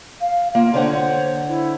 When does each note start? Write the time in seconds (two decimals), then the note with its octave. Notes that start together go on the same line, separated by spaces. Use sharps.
0.21 F5
0.55 A#3 F4
0.74 D3 C5 C#5 F#5
1.48 E4